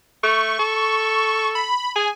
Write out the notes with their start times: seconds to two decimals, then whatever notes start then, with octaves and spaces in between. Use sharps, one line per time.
0.23 A3 C#6
0.59 A4
1.55 B5
1.96 G#4 G#5